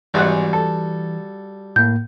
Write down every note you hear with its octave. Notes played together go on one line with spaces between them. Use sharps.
G#1 G#2 E3 G3 F#4 F#5
A4
A2 A#3 G6